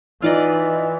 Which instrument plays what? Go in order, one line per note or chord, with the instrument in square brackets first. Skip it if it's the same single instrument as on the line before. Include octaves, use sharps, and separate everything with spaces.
[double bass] E3 [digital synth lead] D#4 [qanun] F4 D5 D#5